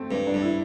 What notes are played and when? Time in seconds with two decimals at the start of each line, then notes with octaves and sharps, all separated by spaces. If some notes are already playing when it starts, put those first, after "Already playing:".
Already playing: A3 C4
0.11 G2
0.27 D4
0.34 G2
0.42 E4